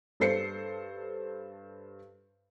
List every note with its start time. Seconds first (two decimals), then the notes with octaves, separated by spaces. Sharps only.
0.20 G2 A4 C5 C7 C#7